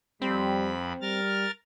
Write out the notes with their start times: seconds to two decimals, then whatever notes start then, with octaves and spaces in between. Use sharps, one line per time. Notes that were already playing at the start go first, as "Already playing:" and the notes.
0.22 F2 G3 C4 B5
1.02 G3 A#4 F6 A6